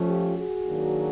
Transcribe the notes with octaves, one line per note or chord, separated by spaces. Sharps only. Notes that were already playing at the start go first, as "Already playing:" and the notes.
Already playing: F3 A3 C#4
F4 G4
F#4 G#4
D#3 F#3 A#3 D4